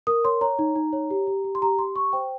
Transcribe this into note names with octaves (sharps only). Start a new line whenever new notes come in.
A#4 D#6
C#5 C6
C#5 A#5
D#4
D#4
C#5
G4
G4
G4
C6
G4 A#5
G4 C6
G4 C#6
C5 G5